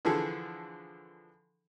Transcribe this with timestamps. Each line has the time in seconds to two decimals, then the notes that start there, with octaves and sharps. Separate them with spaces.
0.05 D3 E3 F3 G#4 A4